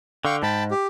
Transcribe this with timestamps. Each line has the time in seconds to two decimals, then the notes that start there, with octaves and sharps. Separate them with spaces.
0.25 D3 F5 G5 C#6
0.43 G#2 G5 A5 B5
0.71 G4